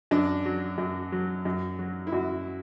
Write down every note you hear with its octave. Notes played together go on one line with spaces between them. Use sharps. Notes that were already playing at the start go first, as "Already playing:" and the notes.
F#2 D4
F#3
F#2
F#3
F#2
F#3
E4
F#2 F#4